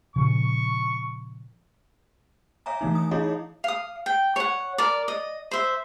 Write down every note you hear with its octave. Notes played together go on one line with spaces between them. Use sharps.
A#2 C#3 F3 C#6
C#5 E5 F5 G#5 A#5
E3 A3 D#4
D#6
D#4 E4 G#4 C#5 D#5 F5
F5 D#6
G5
C#5 F#5
A#4 D5
D#5
C5 E5